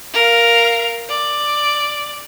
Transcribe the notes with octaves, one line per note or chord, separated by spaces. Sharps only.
A#4 F5
D5